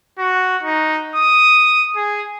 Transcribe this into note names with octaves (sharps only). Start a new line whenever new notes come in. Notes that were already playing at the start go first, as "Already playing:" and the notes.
F#4
D#4
D#6
G#4